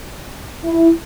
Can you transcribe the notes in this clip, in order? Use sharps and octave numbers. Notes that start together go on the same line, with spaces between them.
E4